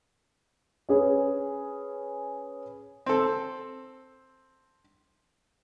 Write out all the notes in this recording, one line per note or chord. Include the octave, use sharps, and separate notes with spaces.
C#4 G#4 B4
C4 A4